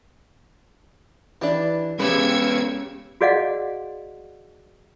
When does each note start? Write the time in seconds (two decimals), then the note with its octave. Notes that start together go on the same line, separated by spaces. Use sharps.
1.42 E3 D4 G4
2.00 C#3 G3 G#3 B3 B4 E6 G#6 C#7
3.21 F#4 G#4 D5 D#5 F5 F#5